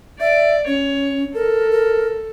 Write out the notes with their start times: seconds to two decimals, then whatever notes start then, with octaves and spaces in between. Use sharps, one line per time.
0.20 D5 E5
0.67 C#4 C#5
1.34 A4 A#4
1.71 A#4